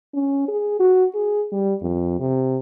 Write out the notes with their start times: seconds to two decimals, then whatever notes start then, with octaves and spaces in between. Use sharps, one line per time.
0.14 C#4
0.48 G#4
0.80 F#4
1.15 G#4
1.52 G3
1.82 F2
2.20 C3